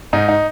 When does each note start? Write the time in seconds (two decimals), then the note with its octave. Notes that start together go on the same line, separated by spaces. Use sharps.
0.13 G#2 D#4
0.29 D#4